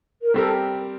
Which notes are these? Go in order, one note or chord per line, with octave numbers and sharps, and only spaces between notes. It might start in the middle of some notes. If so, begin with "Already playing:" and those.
A#4
G3 C4 G4 A4 A#4